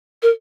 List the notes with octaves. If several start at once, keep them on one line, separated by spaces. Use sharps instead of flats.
A#4